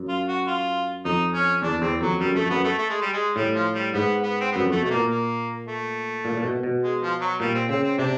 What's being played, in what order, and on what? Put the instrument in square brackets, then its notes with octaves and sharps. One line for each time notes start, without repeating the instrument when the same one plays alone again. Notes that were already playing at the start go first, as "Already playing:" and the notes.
Already playing: [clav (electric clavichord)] F#2
[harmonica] F4
F#4
F4
[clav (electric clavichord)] F2 [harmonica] D#4
[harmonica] C#4
[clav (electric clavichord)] E2 [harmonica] D4
[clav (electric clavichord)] E2 [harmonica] C4
[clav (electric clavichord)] F2 [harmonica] F#3
[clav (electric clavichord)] F#2 [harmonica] G3
[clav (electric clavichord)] F2 [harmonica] A3
[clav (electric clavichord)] F#2 [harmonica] B3
[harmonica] A3
A3
G#3
G3
G#3
[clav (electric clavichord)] A2 [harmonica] G3
[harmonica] F3
G3
[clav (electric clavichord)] G#2 [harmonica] B3
[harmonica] B3
C4
[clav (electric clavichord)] F#2 [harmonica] B3
[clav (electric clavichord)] F2
[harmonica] A3
[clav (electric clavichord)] B2 [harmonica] A3
[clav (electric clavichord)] A#2 [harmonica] A#3
[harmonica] A#3
A3
[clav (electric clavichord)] A#2
A#2
B2
B2
[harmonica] G#3
F3
F#3
[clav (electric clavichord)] A#2 [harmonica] G3
[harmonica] C4
[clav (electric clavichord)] C#3 [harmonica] C4
[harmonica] C4
[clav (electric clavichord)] C3 [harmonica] D4